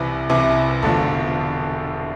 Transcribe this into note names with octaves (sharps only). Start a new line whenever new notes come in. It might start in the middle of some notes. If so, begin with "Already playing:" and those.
Already playing: C2 C3 E3
C2 C3 E3
E1 E2 D3 F3 A4